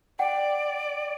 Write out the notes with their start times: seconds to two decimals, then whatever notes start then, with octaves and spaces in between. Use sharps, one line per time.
0.19 D5 F#5 G5